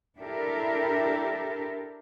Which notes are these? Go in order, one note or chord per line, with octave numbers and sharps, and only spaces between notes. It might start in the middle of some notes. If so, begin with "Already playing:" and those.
D4 E4 G4 A4 A#4 E5